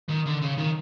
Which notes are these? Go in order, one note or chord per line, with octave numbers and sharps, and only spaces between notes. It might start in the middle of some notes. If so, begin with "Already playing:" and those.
D#3
D3
C#3
D#3